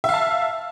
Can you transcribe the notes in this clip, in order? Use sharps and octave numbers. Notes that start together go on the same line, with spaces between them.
E5 F5 A5